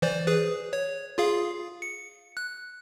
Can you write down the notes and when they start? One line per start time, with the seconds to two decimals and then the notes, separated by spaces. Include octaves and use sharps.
0.02 E3 C5 D5
0.27 G#4 B4
0.73 C#5
1.18 F4 G#4 F5
1.82 C#7
2.37 F#6